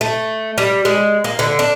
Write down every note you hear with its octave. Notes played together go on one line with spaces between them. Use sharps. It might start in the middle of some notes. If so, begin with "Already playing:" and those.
A3
G3
G#3
A#3
D3
D4